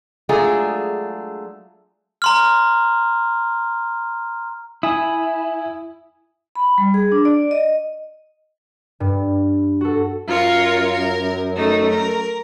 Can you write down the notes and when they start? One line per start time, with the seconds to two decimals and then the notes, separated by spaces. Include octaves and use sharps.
0.29 F#3 G#3 A3 D4 F4 G#4
2.22 A#5 C6 F6
4.83 E4 G#5 D#6
6.55 B5
6.78 G3
6.94 G#4
7.12 D4
7.25 D5
7.51 D#5
9.00 G2
9.81 F#4 A4
10.28 F#2 F4 A#4 C#5
10.92 A#4
11.55 A3 D#4
11.88 A#4